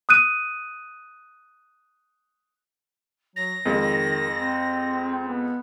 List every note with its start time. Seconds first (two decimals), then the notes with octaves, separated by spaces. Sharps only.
0.09 D#6 F#6 D#7
3.36 F#3 A#6
3.65 F2 D#3 G#3
4.39 C4
5.28 B3